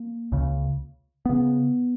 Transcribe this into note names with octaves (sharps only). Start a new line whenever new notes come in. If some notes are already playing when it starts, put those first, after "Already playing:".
Already playing: A#3
C#2 C#3
C#3 B3